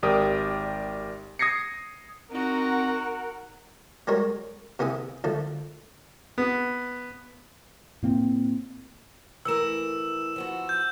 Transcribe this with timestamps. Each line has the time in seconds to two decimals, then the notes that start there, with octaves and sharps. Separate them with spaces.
0.03 G#1 G4 A#4 D5 D#6
1.39 D#6 G#6 A#6 C7 C#7
2.31 C4 D#4 F#4 A#4 F#5
4.07 G3 G#3 F#4 A#4 C#5
4.79 C3 B3 E4 G#4
5.24 D2 F3 A3
6.38 B3
8.02 A2 A#3 C4
9.45 E3 A3 A#4 E6 E7
10.36 F3 B3 F#4
10.69 G6